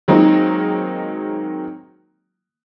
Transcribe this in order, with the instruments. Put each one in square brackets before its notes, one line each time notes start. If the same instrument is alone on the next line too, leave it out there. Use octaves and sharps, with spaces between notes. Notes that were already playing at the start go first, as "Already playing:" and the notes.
[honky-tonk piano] D#3 F#3 G#3 A#3 C4 D#4